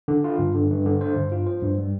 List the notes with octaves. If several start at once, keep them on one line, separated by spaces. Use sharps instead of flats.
D3
F4
G2
D3
G2
D3
C5
G2
F4
C5
G2
G3